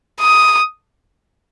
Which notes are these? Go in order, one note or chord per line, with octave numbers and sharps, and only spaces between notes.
D#6